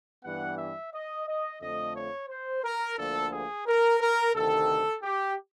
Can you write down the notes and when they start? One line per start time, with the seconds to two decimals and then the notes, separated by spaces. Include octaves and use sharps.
0.24 G2 E3 G3 B3 F#5
0.58 E5
0.93 D#5
1.26 D#5
1.61 F2 D3 F3 A3 D#5
1.96 C#5
2.29 C5
2.63 A#4
2.97 D2 D3 F3 A#3 A4
3.32 G#4
3.67 A#4
4.00 A#4
4.34 D2 C3 D#3 A4
5.03 G4